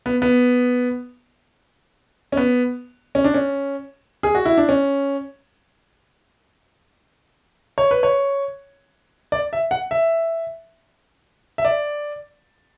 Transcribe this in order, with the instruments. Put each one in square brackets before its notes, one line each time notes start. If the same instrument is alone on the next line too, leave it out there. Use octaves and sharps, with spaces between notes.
[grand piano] B3
B3
C#4
B3
C#4
D4
C#4
G#4
F#4
E4
D4
C#4
C#5
B4
C#5
D5
E5
F#5
E5
E5
D5